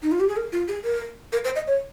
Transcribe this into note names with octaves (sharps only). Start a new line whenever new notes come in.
D#4
F4
G4
G#4
A#4
F4
G#4
A#4
A#4
C5
D#5
C#5